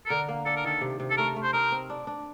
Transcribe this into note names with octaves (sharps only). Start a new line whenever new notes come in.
A4
D3 A#4
A#3
D4 A4
A#4
D#3 A4
C3
C3
A4
A3 A#4
A3
C5
D#4 A#4
C4
D4
D4